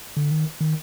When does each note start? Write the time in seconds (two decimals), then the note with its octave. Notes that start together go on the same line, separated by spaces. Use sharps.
0.17 D3
0.31 D#3
0.61 D#3